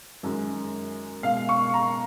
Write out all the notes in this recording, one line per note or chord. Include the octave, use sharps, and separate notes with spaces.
F#2 D#3 G#3
B2 G#3 F5
C#6
A#5